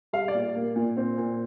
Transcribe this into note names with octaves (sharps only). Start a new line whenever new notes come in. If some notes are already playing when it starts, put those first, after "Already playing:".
G3 F5
D5
A#2
A#3
A#2
C4
A#2